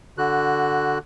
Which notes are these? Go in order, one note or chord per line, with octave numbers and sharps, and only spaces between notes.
D3 F#4 F#6